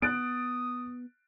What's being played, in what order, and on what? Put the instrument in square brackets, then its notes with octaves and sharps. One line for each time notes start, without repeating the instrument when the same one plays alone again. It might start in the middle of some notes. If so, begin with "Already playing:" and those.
[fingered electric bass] B3 [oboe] D#6 [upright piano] F#6 A6 D7